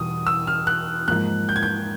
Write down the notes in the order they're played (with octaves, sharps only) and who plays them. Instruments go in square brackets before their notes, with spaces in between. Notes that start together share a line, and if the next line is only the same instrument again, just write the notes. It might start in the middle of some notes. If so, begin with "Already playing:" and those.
Already playing: [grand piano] E2 B2 G3 [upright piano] D#6
[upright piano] E6
F6
F#6
[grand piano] G#2 F3 A#3 [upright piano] F#6
[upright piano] G6
G#6
G6